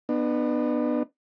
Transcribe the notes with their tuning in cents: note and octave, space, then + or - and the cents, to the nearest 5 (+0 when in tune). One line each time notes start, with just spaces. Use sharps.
B3 +0 D4 +45